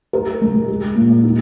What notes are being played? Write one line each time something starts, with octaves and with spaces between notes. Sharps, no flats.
A#4
G#3
G#4
A#2
D#4